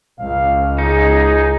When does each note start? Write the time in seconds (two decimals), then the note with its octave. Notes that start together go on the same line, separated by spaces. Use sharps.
0.19 C#2 F5
0.78 D#4 G#4